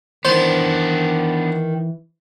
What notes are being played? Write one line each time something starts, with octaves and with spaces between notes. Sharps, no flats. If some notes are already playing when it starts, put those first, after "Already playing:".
D#3 E3 B3 D4 C5